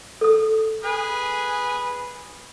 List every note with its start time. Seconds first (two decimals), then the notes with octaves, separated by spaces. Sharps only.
0.21 A4 D#6
0.84 G#4 B4 G#5